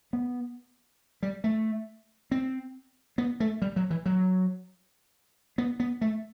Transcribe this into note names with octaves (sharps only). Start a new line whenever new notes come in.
B3
G3
A3
C4
B3
A3
G3
F#3
E3
F#3
B3
B3
A3